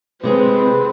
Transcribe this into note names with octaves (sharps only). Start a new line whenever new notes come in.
C3 G#3 C4 G#4 B4